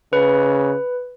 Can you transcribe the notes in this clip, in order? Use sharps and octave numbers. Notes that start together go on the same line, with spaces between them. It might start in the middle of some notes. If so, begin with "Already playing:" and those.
C#3 B4